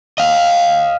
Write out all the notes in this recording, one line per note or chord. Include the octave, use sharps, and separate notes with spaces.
D#5 F5